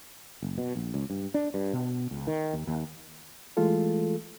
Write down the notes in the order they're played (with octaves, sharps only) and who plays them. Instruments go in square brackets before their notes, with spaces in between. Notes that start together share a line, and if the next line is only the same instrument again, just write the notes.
[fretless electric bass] F#1
B2
A#1
C#2
G2
D4
G2
B2
C#2
D#3
D#2
D#2
[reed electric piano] E3 G#3 A3 F4 A4